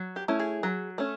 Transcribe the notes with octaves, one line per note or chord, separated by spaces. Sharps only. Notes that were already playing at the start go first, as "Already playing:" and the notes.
Already playing: F#3
G4
A3 C#4 E4
G#4
F#3
A3 C#4